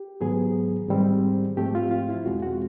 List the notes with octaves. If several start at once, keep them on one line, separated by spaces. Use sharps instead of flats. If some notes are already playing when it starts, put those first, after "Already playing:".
Already playing: G4
G#2 D#3 F#3 B3 G#4
G#2 D#3 G3 C4
G#2 F3 A3 C4 G4
F4
F4
E4
E2 B2 G#3 C4 F#4
F#4